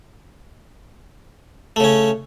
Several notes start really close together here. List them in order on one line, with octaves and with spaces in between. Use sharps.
A3 C#3 C#4